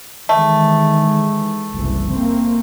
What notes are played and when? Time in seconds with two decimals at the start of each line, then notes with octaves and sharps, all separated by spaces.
0.29 D#3 E3 G#3 A3
1.73 F#1 C2 E3
2.10 A#3 C4